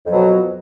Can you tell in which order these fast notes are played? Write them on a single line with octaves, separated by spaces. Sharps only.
F2 F#3 B2